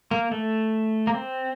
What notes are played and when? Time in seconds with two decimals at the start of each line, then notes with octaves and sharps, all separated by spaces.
0.11 A#3
0.31 A3
1.07 A#3
1.14 C4